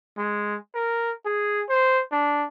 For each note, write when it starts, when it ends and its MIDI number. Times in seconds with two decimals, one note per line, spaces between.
0.17 0.56 56
0.75 1.12 70
1.25 1.63 68
1.69 2.01 72
2.12 2.47 62